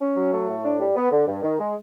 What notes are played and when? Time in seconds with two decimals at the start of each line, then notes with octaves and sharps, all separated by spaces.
0.01 C#4
0.17 F#3
0.33 A3
0.48 A2
0.64 D4
0.79 G3
0.96 B3
1.12 D3
1.27 G2
1.43 D#3
1.59 G#3